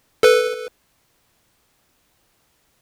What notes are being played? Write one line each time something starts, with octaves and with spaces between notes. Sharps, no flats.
A4 B4